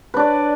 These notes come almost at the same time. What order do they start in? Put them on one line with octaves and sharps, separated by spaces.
B4 D4 D5